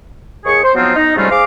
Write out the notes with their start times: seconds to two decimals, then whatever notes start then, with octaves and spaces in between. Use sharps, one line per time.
0.45 D#2 G#4 C#6
0.63 C5
0.75 F3 F#3 B3 C4 D#4 F4
0.95 D#4
1.16 G#2 C3 G3 A3 C#4 F4
1.30 G#4 C5 F5 D6